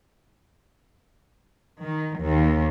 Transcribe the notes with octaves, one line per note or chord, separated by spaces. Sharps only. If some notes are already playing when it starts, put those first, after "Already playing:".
D#3
D#2